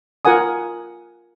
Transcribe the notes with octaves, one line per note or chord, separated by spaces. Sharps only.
F4 A#4 F#5 G#5 D#6